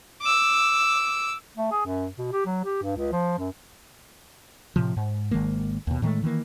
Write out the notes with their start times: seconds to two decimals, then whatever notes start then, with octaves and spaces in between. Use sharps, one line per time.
0.22 D6 E6
1.58 A3
1.72 G#4
1.86 F#2
2.18 B2
2.32 G4
2.46 F#3
2.64 G4
2.83 G2
2.97 C#2
3.12 F3
3.38 F#2
4.76 A2 C3 F3
4.97 G#2
5.31 G#1 D#3 G#3 A#3
5.87 D#2 B2
6.02 A2 D#3 G#3 A3
6.22 D#3 E3 A3 A#3